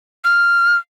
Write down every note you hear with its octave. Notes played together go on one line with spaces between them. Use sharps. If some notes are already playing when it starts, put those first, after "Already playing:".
F6